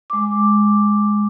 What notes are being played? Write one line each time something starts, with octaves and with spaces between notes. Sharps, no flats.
G#3 D6